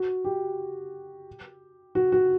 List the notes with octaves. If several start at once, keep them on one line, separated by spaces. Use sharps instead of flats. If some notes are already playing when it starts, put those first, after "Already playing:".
Already playing: F#4
G4
F#4
F#4